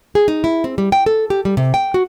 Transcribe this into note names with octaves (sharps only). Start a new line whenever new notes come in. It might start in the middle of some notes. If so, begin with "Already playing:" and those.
G#4
D#4
E4
C4
G3
G5
A4
G4
G3
C3
G5
F#4